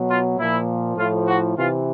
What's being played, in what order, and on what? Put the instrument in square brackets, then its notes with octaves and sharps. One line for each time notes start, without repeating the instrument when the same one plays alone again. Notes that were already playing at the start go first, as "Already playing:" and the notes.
Already playing: [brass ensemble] B2 F#3
F4
A#2 F3 E4
A2 F3 F4
F#4
C3 E3 F4